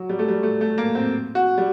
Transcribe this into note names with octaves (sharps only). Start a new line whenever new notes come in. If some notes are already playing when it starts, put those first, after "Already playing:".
Already playing: F#3
G3
A3
G3
A3
A3
A#3
C4
F#4
G3